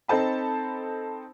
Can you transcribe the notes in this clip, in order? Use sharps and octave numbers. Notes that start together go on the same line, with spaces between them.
C4 D#4 A4 C5 A5 B5